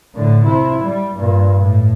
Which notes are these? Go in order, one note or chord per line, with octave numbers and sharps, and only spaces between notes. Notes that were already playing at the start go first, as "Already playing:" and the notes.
A2 D3
C3 E4
G3
G2 A#2
A2